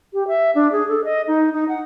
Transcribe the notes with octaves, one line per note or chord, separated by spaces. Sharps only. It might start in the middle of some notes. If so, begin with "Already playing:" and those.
G4
E5
D4
G#4
A4
D#5
D#4
D#4
F#5